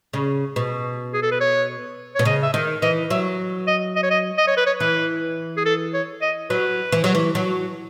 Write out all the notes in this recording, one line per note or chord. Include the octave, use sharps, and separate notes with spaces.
C#3
B2
G#4
A4
B4
C#5
B2 C#5
C#3 D#5
E5
D#3 D#5
E3 D#5
F#3 E5
D#5
D#5
C#5
D#5
D#5
C#5
B4
C#5
E3 B4
G#4
A4
C#5
D#5
F#3 B4
E3
F#3
E3
F#3